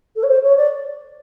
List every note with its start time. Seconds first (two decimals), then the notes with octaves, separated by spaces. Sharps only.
0.16 A4
0.23 C#5
0.29 C5
0.43 C#5
0.57 D5